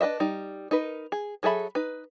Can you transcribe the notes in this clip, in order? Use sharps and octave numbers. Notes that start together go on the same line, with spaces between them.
D4 B4 D#5 E5
G3 D#4
D#4 A#4 B4
G#4
F#3 G#4 A4 E5 B5
D#4 B4